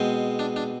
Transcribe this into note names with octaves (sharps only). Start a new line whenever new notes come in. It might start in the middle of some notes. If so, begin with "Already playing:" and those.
Already playing: B2 G#3 C4
D4
D4